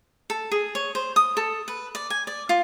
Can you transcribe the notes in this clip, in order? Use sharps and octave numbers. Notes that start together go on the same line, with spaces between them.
A4
G#4
C#5
C5
D#6
A4
B4
D5
G#5
D5
F4